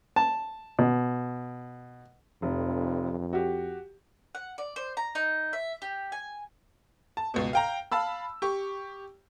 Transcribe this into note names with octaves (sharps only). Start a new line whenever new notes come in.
A5
B2
F1 F2
F#4 G4
F#5
D5
C5
A#5
D#4
E5
G4
G#5
A5
C#2 B2
F5 G5 A#5
F5 A5 B5 E6
G4 C#6